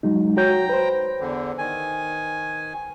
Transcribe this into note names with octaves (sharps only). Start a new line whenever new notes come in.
F#3 G#3 D#4
F#4 C#5 G5 A#5 G6
B4 C5
E2 D3
D#3 G#5